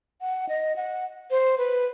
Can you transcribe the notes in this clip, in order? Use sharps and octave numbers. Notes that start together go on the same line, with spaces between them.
F#5
D#5
F#5
C5
B4